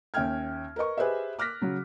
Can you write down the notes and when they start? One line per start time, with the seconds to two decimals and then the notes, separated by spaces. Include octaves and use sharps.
0.14 D#2 C#4 E5 G5 F6 G#6
0.76 A#4 B4 D#5 C#6
0.97 G4 G#4 B4 C5 D#5 E5
1.39 D6 F6 F#6 A#6 B6
1.61 C#3 F#3